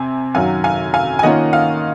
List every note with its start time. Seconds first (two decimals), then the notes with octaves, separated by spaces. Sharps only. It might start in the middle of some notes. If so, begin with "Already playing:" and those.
Already playing: C3 C4 G#5
0.35 F#2 D#3 F#3 F5 G#5
0.64 F5 G#5
0.94 F5 G#5
1.19 G#5
1.23 D#3 A#3 C#4 F4 D#5 F#5
1.53 F5